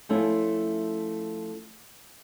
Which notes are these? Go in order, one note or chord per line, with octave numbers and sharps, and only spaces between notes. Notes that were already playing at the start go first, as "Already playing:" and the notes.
F3 A3 C#4 E4 F4